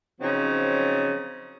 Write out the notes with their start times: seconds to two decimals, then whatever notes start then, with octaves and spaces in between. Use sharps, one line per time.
0.20 C#3 F3 F#3 C4 D#4